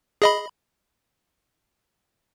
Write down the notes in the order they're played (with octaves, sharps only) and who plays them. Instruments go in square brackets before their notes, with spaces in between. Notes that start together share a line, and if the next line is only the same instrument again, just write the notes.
[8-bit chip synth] G#4 D#5 B5